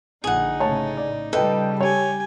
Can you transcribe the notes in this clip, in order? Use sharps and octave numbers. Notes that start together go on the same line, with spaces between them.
A#1 D3 D#4 G#4 F#5
A2 C#3 C#5 A5
D5
C#3 G3 A4 B4 D#5 G5
G4 C#5 G#5